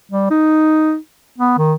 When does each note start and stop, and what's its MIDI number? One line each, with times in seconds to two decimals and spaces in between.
0.11 0.26 55
0.30 0.96 63
1.38 1.54 59
1.58 1.74 51